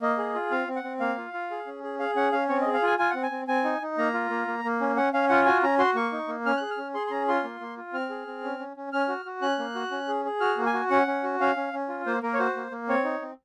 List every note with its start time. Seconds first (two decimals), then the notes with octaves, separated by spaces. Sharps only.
0.02 A#3 D#5
0.18 G#4
0.34 F4
0.51 C4 F5
0.68 C4
0.76 F#5
0.84 C4
1.00 A#3 F5
1.18 F4
1.33 F4
1.51 G#4
1.67 C#4
1.84 G#4
1.99 G#4 F5
2.16 C#4 F#5
2.32 C#4 F5
2.49 C4 C#5
2.61 D#5
2.66 G#4
2.74 F5
2.82 F4 G#5
2.99 F4 G#5
3.10 C4 F#5
3.23 G#5
3.31 C4
3.48 C4 G#5
3.64 D#4
3.82 D#4
3.98 A#3 A#5
4.14 F4
4.30 A#3
4.47 A#3
4.64 A#3
4.81 C#4
4.96 C#4 F#5
5.14 C#4 F5
5.29 F4 F#5
5.46 F#4 G#5
5.63 C#4 A#5
5.79 F#4 C6
5.95 A#3 C#6
6.12 D#4
6.28 A#3
6.46 C#4 F6
6.57 G#4 F#6
6.71 F6
6.78 C#4
6.94 G#4 C6
7.07 C6
7.11 C#4 A#5
7.28 F4 C6
7.44 A#3
7.60 A#3
7.77 F4
7.93 C4 F6
8.10 G#4
8.27 C4
8.44 C#4
8.59 C#4
8.77 C#4
8.93 C#4 F6
9.09 F#4
9.25 F#4
9.42 C#4 F#6
9.59 A#3
9.75 F#4
9.91 C#4
10.08 G#4
10.25 G#4
10.41 F#4 F6
10.58 A#3
10.66 G#5
10.74 F#4
10.90 C#4 F#5
11.07 C#4
11.23 F#4
11.40 C#4 F5
11.56 C#4
11.73 C#4
11.89 F4
12.06 A#3 C5
12.23 A#3 A#4
12.34 C#5
12.38 F#4 C5
12.56 A#3
12.72 A#3
12.89 C4 C#5
13.04 D#4
13.22 C4